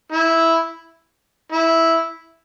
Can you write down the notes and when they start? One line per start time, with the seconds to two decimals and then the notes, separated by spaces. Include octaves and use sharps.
0.12 E4
1.52 E4